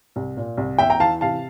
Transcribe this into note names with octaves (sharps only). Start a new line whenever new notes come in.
C2
A#2
C2
E2 E5 G5
G5 A#5
E3 F5 A5
C3 F5 A5